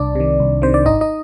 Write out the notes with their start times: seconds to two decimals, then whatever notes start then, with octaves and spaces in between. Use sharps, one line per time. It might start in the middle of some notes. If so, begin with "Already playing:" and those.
Already playing: C2 D4 D5
0.15 C3 D#3
0.40 C2
0.62 C3 D#3 C5
0.74 D5
0.85 G#1 D#4 D#5
1.01 D#4 D#5